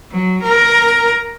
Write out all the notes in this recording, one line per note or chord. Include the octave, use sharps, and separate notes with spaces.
F#3
A#4